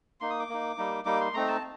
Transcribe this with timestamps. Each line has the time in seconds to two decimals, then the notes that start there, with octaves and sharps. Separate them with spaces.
0.21 A#3 D#4 C6
0.30 D#6
0.40 D6
0.49 A#3 D#4
0.77 G3 A#3 D#4
1.05 G3 A#3 D#4 D6
1.21 C6
1.34 A3 C4 D#4 A#5
1.48 A5